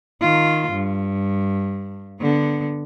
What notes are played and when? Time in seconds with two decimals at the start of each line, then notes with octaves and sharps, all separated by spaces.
0.22 D#3 F4
0.73 G2
2.21 D3 B3